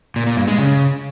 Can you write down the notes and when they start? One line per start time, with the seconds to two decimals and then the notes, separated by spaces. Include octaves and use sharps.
0.16 A#2
0.27 A#2
0.37 G2
0.48 G#3
0.58 C#3